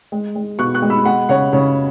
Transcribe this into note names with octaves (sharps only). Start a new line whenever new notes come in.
G#3
G#3
B2 C#6 F#6
C#6 F#6
G#3
B5 E6
G#3 F#5 B5
C#3 C#5 F#5
C#3 C#5